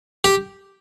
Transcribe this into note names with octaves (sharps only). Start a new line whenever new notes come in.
G4